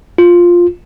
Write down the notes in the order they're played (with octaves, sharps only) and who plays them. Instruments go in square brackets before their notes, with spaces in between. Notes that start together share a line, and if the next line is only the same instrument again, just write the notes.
[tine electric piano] F4